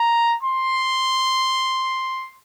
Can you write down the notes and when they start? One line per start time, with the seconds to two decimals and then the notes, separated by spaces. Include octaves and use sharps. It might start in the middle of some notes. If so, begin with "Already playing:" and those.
Already playing: A#5
0.43 C6